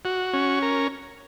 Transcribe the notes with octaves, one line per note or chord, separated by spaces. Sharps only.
F#4
C#4
A#4